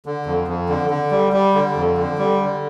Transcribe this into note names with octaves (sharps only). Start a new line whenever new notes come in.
D3
F2
F2
D3
D3
G3
G3
D3
F2
D3
G3
D3